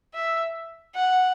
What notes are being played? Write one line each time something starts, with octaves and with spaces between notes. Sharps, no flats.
E5
F#5